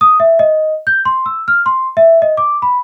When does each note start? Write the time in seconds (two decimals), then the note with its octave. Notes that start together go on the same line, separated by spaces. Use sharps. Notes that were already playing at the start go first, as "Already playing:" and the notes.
0.01 D#6
0.20 E5
0.39 D#5
0.87 G6
1.05 C6
1.26 E6
1.48 F6
1.66 C6
1.97 E5
2.22 D#5
2.37 D6
2.62 B5